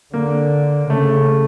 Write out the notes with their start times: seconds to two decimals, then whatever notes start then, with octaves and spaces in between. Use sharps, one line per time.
0.14 D3 A#3
0.89 C#3 A3